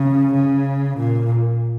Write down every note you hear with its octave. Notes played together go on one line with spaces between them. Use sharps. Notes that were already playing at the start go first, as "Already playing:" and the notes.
Already playing: C#3
C#3
A#2